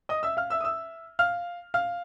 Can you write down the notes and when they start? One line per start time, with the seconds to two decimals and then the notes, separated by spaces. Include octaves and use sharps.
0.09 D#5 D#6
0.23 E5 E6
0.37 F5 F6
0.50 E5 E6
0.61 D#6
0.64 E5 E6
1.19 F5 F6
1.74 F5 F6